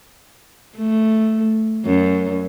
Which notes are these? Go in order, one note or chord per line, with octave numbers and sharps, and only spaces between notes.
A3
F#2